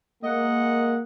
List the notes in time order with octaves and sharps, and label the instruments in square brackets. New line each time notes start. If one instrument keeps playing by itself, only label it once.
[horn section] G#3 D#5 F#5 [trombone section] A#3